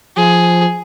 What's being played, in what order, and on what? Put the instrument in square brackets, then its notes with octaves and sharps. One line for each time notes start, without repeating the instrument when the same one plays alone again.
[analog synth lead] F3 [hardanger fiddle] G#4